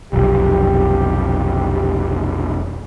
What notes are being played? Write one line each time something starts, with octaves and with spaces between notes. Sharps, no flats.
F1 B1 G4